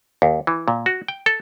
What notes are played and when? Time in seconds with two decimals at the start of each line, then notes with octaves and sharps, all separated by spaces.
0.22 D#2
0.47 E3
0.68 A#2
0.86 F#4
1.08 G5
1.26 A4